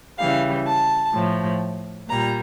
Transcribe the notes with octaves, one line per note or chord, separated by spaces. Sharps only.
C#3 E3 G3 F5
A5
A2 F3
A#2 G3 A#5